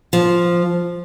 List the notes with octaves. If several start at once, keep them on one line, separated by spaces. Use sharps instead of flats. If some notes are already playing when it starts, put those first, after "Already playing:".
F3